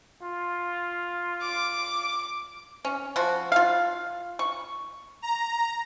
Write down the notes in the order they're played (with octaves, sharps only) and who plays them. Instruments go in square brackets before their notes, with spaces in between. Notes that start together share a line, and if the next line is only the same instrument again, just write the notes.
[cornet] F4
[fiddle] D6
[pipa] C#4
F3 F#4
F4 F5
C#6
[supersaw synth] A#5